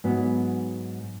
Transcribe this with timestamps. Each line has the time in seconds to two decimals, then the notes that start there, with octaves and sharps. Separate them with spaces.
0.04 G#2 F#3 B3